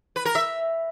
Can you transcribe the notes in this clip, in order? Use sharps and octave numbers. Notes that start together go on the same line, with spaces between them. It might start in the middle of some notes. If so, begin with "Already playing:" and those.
B4
A#4
E5